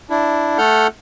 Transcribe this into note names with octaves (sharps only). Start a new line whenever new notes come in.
D4 E4
A3 A4 F#5 F6 G6